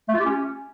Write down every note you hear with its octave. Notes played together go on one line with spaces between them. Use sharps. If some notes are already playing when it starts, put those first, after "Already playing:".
A3
F4
G4
C#4